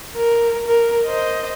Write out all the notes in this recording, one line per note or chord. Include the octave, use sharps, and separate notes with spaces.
A#4
A#4
C5 D#5